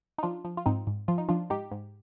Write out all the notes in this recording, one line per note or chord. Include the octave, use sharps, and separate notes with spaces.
D#4
F3 D4 F4
F3
F4
G#2 C4 D#4
G#2
F3 F4
D#4
F3 D4 F4
G#2 D#4 G4
G#2